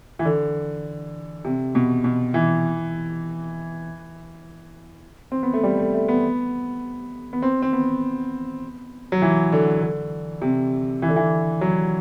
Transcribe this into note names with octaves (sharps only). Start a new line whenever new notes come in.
E3
D3
C3
B2
B2
E3
C4
B3
A3
G3
A3
A3
B3
B3
C4
C4
B3
F#3
E3
D3
D3
C3
E3
D3
E3
F#3